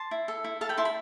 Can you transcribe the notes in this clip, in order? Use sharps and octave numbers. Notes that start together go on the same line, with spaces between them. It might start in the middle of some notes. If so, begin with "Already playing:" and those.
Already playing: A5 C6
E4
A4
E4
A4 F5 A5
G5 B5
E4 A5 C6
B5